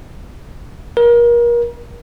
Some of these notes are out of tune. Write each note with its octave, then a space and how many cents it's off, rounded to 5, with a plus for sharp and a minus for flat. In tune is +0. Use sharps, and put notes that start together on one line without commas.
A#4 +30